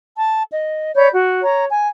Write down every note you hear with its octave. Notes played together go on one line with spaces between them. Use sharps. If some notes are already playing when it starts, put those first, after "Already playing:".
A5
D#5
C#5 D5 B5 G6
F#4
C#5 A#5
G#5